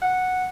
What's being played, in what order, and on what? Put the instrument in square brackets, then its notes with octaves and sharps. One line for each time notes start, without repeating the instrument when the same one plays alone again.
[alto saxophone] F#5